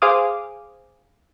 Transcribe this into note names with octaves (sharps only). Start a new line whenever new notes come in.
G#4 C5 F5 G#5 D6 D#6